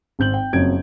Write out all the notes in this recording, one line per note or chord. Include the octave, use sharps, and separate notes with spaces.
G#1 C4 G6 F#7
G5
F#1 F2 F#3 C#4 G#6 D7